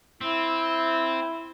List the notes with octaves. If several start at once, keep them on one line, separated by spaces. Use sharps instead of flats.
C4 E4